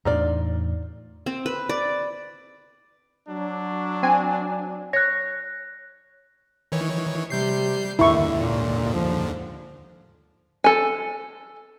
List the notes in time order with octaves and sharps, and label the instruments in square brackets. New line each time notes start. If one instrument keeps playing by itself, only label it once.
[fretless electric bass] E2 A2 D4 [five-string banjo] D#4 F4 D5
[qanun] C4
B4
D5
[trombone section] F#3 D4
[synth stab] C4 G#5
[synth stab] C#5 [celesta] F#6 A#6
[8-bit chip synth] D#3 E3 C#5
[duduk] C3 [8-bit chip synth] G3 G6 C7
[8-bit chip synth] D#2 G#2 D3 [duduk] D#3 [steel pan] E4 C#6
[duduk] A#2
F3
[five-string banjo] A4 G#5